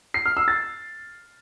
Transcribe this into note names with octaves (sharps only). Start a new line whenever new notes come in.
C7
F6
E6
A6